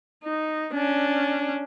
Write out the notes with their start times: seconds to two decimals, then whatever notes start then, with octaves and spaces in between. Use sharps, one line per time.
0.24 D#4
0.73 C#4 D4